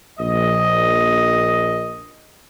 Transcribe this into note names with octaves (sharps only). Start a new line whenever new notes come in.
A#1 D#5